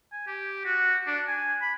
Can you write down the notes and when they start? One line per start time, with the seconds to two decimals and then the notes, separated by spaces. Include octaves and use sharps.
0.12 G#5
0.27 G4
0.65 F#4
1.07 D4
1.28 G#5
1.62 B5